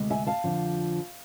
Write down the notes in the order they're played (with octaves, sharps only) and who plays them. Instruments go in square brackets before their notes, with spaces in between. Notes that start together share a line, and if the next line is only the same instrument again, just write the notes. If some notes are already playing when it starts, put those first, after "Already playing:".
Already playing: [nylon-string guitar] D2 C3 G#3
E5 G#5
F5 A5
F2 D3 F3